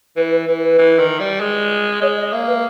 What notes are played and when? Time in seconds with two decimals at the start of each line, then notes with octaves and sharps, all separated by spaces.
0.16 E3 B4
0.31 B4
0.47 E3 B4
0.63 B4
0.78 E3
0.99 D#3
1.20 G3
1.40 G#3
2.01 G#3 C#5
2.17 D#5
2.32 A#3 E5
2.47 B4